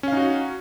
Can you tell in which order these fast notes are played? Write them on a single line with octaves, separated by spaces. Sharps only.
C#4 F5 D#4 F#4